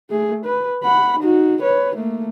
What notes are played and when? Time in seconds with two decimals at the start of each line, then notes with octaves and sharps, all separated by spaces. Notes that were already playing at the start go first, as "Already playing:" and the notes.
0.10 A3 G#4
0.45 B4
0.83 F#5 B5
1.20 D#4 F#4
1.62 B4 C#5
1.96 A3 A#3